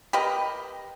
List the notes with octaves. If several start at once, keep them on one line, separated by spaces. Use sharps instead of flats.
G4 A#4 B4 D#5